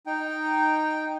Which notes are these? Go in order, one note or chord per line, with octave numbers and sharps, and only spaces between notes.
D#4 G5